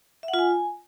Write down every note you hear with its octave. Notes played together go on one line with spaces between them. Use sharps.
E5
F#5
F4
G#5